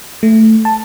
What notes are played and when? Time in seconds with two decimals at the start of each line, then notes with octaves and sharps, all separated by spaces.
0.23 A3
0.65 A5